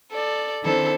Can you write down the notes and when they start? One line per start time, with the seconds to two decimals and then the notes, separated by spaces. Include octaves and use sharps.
0.12 A4 D5
0.63 D#3 C4 D4 E4 A4 C5